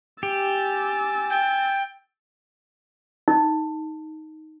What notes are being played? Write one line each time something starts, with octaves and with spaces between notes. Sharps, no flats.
G4 G#5 E6 A6
G5
D#4